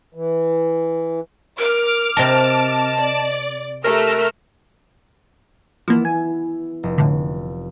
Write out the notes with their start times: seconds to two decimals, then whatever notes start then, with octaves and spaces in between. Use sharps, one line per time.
0.14 E3
1.59 A#4 D6 F6
2.17 C3 A#4 D#5 A5
2.98 D5
3.84 A3 G4 A#4 E6 F6
5.88 E3 F3 A#3 B3 E4
6.05 G#5
6.83 F1
6.98 A2 D3